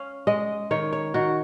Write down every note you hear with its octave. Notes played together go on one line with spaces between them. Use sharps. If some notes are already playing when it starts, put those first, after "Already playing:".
Already playing: C#4 F5
G#3 D#5
D#3 C#5
C#5
D#3 F#4